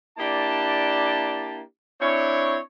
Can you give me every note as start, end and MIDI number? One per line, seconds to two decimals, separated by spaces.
0.18 1.61 58
0.18 1.61 62
0.18 1.61 64
0.18 1.61 67
0.18 1.61 74
0.18 1.61 81
2.01 2.57 60
2.01 2.57 62
2.01 2.57 64
2.01 2.57 73